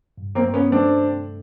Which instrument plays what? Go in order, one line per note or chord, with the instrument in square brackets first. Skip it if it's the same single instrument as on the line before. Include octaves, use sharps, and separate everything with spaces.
[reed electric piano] G2
[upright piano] A#3 C4
[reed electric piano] G2
[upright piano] B3 C#4
[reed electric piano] A3 [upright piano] C4 D4